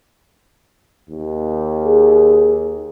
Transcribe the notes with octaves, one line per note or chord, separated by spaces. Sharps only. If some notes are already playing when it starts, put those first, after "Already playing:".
D#2
G#4